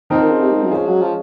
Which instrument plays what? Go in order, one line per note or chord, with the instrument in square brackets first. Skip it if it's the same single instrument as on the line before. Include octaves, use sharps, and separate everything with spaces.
[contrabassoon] D#3 [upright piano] F3 C4 D#4 A#4
[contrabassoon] D#3
C#3
C3
G#2
F#2
[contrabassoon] F3 [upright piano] G#3 C#4 G#4
[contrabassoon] F#3
F3